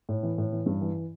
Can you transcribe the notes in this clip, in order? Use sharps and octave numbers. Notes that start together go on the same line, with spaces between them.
A2
E3
A2
E3
G2
E3